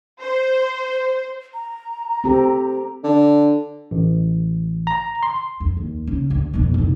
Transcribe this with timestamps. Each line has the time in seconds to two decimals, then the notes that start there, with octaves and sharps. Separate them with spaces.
0.21 C5
1.54 A#5
2.24 C4 G4 A4
3.03 D3
3.91 A1
4.87 A#5
5.23 C6
5.60 F2
5.77 D#2
6.07 C#3
6.30 D2
6.53 F2 B2
6.74 F1 E4